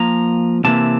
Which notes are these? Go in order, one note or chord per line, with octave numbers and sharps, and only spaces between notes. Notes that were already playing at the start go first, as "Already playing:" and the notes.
Already playing: F3 A#3 A#5
E2 C3 E3 A#3 A5